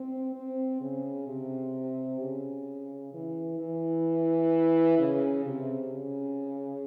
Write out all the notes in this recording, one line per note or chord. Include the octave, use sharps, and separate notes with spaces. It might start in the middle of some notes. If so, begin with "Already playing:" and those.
Already playing: C4
C4
C#3
C3
C#3
E3
E3
C#3
C3
C#3